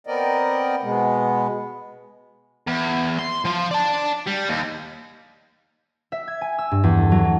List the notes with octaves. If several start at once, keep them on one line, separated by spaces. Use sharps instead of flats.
B3 C4 A#4 D5 D#5
B2 G#3 B3
E2
C6
F3 F4
D5 A5
G3
D#2
E5
G#6
G#5
E6
G2
E2
A4
F#3
A3